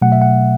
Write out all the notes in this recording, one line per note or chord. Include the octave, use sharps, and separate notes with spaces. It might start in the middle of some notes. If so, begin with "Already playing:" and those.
B2 F#3 A3 F#5
E5
F#5